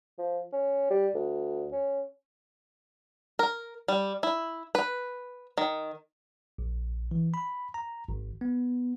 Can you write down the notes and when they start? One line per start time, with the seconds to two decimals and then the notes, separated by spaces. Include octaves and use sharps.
0.18 F3
0.53 C#4
0.90 G3
1.15 D2
1.72 C#4
3.39 A#4
3.88 G3
4.23 E4
4.75 B4
5.58 D#3
6.58 A#1
7.11 E3
7.34 B5
7.74 A#5
8.08 G#1
8.41 B3